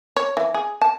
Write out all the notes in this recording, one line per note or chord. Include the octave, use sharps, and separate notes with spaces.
C#5
E3
G#4
A5